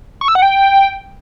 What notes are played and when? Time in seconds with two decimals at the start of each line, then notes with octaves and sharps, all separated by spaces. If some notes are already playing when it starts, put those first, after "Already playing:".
0.21 C#6
0.28 E6
0.35 F#5
0.42 G5